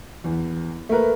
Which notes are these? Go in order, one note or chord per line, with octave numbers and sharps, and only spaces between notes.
E2
A3 A#3 A#4 B4